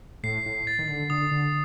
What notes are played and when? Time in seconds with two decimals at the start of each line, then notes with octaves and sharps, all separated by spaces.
0.23 A2 C7
0.46 A2
0.67 A6
0.79 D#3
0.88 D3
1.10 D3 D#6
1.31 D3